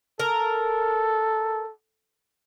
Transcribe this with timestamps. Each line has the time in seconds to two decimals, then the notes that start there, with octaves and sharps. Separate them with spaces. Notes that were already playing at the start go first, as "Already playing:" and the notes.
0.20 A4 A#4